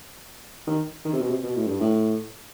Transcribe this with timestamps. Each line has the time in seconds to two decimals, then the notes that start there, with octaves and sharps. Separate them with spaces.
0.67 D#3
1.05 D#3
1.13 C3
1.21 B2
1.30 C3
1.43 B2
1.56 A2
1.67 G2
1.81 A2